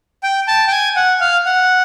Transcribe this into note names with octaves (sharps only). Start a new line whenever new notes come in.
G5
A5
G5
G#5
F#5
F5
F#5